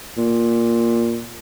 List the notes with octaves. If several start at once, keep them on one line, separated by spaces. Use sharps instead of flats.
A#2